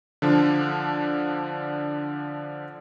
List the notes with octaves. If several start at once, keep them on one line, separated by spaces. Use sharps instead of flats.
D3 F3 D4